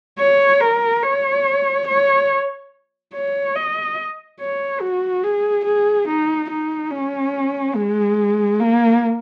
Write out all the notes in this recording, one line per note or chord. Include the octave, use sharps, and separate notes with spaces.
C#5
A#4
C#5
C#5
C#5
D#5
C#5
F#4
G#4
G#4
D#4
D#4
C#4
G#3
A#3